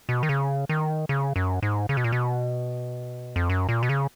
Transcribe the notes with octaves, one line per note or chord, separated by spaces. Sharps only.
B2
D#3
C#3
D#3
C#3
F#2
G#2
C#3
B2
A#2
B2
F2
F#2
A#2
B2
C#3